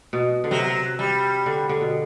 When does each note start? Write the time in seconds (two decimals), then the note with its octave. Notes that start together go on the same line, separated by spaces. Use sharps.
0.13 B2
0.44 D3
0.51 C3 F#3
0.99 G3
1.46 D3
1.69 D3
1.81 B2